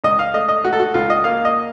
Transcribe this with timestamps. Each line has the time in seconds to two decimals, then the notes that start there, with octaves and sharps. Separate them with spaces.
0.04 C#2 D#5
0.19 F5
0.34 A3 D#5
0.49 D#5
0.64 A3 F#4
0.73 A4
0.80 F#4
0.94 C#2 F4
1.10 D#5
1.24 A#3 F5
1.45 D#5